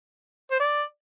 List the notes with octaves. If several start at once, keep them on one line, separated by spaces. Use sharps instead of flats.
C5
D5